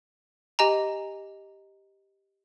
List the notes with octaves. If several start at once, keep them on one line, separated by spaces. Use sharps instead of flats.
G4 D#5 G#5 A#5